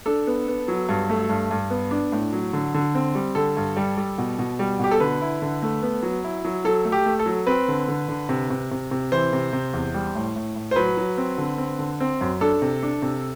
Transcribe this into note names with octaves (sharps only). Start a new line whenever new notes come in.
D4 A4
B3
B3
F#3
G2
A3
G2
G2
B3
D4
A2
F#3
D3
D3
C4
G3
D3 A4
G2
G3
G3
B2
B2
G3
B2 G4
A4
D3 B4
E4
D3
A3
B3
F#3
E4
F#3
F#3 A4
A3
G4
A3
A4
F#3
C4 B4
D3
D3
D3
C3
C3
C3
C3
E3 C5
C3
C3
E2
G3
A2
A2
A2
C5
F#3 B4
F#3
C4
D3
C4
D3
C4
F#2
D4 A4
C3
D4
C3